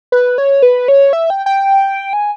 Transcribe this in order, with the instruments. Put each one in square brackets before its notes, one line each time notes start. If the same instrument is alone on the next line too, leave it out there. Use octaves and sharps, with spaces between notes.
[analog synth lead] B4
C#5
B4
C#5
E5
G5
G5
G#5